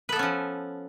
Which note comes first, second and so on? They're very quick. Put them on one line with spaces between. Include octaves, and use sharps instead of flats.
B4 A4 B3 C#4 F3